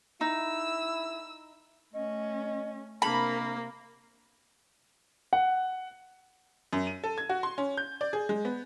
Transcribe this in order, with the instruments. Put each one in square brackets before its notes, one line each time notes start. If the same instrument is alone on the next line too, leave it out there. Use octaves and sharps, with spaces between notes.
[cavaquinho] D#4 [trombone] E4 [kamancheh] E6
[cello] A3 C#4 [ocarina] D#5
[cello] C3 A#4 [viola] A#3 [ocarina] D4 [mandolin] B5
[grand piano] F#5
[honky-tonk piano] F#2
D#7
A4
G#6
F#4
C6
C#4
G6
D5
G#4
G#3
B3